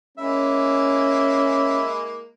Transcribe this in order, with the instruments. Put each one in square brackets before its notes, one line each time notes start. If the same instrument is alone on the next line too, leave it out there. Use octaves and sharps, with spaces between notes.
[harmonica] G#3 A#3 E4 [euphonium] C#4 [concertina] E5